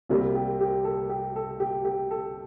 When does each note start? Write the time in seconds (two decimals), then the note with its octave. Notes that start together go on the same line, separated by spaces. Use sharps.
0.09 C2 C3 G3 A#3 A#4
0.35 G4
0.61 G4
0.84 A4
1.10 G4
1.36 A4
1.60 G4
1.85 G4
2.11 A4